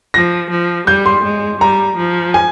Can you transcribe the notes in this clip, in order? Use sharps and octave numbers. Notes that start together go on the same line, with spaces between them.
F3 A#6
F3
G3 G6
C6
G#3
G3 A#5
F3
G#5